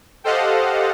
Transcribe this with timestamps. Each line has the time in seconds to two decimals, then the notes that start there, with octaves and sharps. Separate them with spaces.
0.24 G4 A4 C5 D#5 F5 F#5